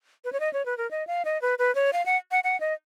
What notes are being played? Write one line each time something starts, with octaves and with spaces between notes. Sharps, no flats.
B4
C#5
D#5
C#5
B4
A#4
D#5
F5
D#5
B4
B4
C#5
F5
F#5
F#5
F#5
D#5